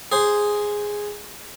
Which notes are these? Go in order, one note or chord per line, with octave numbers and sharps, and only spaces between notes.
G#4 C5